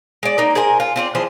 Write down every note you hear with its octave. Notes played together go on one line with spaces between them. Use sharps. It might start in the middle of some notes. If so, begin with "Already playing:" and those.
G#3 D5
A#3 D#4
G#4 A#4 C5 G#5
F4
C4 F4 D5
E3 F3 G#4 C5